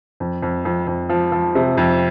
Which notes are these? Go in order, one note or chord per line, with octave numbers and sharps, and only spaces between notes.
F2
F2
F2
F2
F3
F3
C3
F2